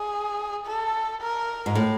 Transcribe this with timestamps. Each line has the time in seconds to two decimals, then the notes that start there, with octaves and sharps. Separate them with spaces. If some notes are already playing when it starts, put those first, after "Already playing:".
Already playing: G#4
0.67 A4
1.21 A#4
1.66 G#2
1.75 A2